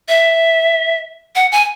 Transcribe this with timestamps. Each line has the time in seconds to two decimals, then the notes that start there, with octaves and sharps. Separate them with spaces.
0.08 E5
1.36 F#5
1.52 G#5